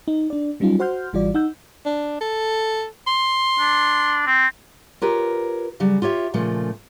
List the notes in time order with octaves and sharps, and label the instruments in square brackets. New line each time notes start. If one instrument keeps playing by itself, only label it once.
[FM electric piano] D#4
D4 D5
F#3 G3 C#4 D#4 F4
F#4 C5 F#5 C6 F6 G6
G#1 E3 G3 F4 F#4 D5
D#4 F#5 E6 G6
[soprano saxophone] D4
A4
C6
[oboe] D4
C4
[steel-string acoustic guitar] F4 G4 A#4 B4 C#5
C#3 F#3 G3
F4 G4 C#5 E5
A#2 C#3 F3 A3